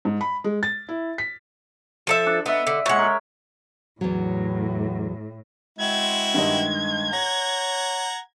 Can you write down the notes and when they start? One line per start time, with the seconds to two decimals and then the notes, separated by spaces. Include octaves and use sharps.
0.05 G#2
0.21 B5
0.44 G#3
0.63 A6
0.89 E4
1.18 B6
2.07 F3 A4 E5
2.26 D4
2.46 B3 D#5 E5
2.67 D3
2.86 A#2 G#3 C#5 F#5
2.99 A#4
4.01 E2 A2 F#3
5.79 G#3 C4 E4 F#4 G#6
6.34 G2 D#3 D#5
7.13 C#5 F#5 A#5 A#6